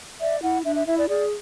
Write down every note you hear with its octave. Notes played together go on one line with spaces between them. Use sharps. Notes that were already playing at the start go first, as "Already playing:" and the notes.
D5 E5
E4 F#5
D4 E5
E5
E4 E5
D5
G#4 D5